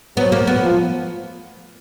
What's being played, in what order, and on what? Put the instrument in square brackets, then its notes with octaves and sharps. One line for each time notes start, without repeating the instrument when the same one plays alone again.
[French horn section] F#3 [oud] B3
[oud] A#3
B3
[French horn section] F3